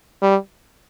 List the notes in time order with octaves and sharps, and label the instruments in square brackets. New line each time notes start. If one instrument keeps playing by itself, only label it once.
[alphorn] G3